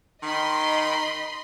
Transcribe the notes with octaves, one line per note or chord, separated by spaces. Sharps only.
D#3 D#5 B5 C6